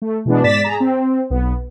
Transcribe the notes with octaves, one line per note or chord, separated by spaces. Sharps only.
A3
B2 E3 G#3 B3 D4
G#2 D5 A6 B6 E7
G#4 A#5
C4
B1 B3